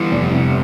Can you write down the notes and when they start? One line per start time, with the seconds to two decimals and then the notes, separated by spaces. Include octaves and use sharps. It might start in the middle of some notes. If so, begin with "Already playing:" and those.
Already playing: E3 G3 B3
0.11 F1
0.32 C3